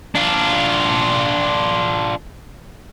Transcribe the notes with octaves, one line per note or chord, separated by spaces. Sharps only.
D4 F4